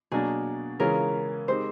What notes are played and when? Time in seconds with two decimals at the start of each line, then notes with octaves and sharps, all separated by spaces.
0.12 B2 F#3 A#3 D4 G#4
0.80 C#3 E3 G#3 C#4 F4 A#4
1.48 G#3 C4 D#4 G4 C5